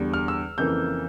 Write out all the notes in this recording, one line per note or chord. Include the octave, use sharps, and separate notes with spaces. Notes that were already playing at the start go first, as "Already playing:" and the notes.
Already playing: E2 D3 G3
F6
E6
F2 C#3 E3 A#3 G6